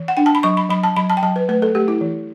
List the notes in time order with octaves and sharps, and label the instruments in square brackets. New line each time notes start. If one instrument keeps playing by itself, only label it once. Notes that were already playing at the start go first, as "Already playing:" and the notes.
Already playing: [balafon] E3
F#5
D4 G5
A5
B5
F#3 C#6
B5
F#3 B5
A5
F#3 B5
A5
G5
F#3 A5
B4
A3 B4
A4
A3 G4
E4
E3